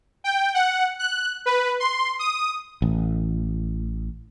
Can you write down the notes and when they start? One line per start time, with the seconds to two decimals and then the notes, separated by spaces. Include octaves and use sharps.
0.24 G5
0.54 F#5
0.99 F#6
1.46 B4
1.80 C6
2.19 D#6
2.82 A1